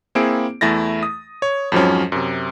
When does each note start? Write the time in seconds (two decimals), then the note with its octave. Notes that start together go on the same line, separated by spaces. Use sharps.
0.15 A#3 C4 E4 G#4 D7
0.61 E2 A3 E4 A6 A#6
1.03 D#6
1.42 C#5
1.72 F2 G#2 F3 F#3 C#4
2.12 F#2 C3